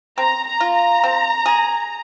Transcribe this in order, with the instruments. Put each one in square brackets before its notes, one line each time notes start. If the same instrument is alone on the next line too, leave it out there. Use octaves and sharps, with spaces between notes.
[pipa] C4 [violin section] A#5
[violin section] A#5
[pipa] F4
[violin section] A#5
[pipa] C4
G#4